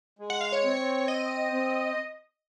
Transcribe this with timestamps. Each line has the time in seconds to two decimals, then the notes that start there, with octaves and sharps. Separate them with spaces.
0.19 G#3
0.30 F#5
0.41 F5
0.52 C#5
0.64 C4
1.08 D#5
1.52 C4